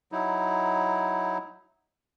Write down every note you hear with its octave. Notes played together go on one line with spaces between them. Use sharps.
F#3 D#4 E4